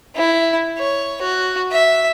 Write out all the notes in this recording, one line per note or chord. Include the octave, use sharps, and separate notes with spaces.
E4
C#5
F#4
E5